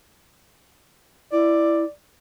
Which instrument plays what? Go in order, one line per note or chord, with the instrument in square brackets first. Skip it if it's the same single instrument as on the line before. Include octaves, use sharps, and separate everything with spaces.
[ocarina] E4 [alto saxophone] D5